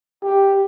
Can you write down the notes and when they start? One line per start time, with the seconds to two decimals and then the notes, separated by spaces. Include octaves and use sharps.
0.24 G4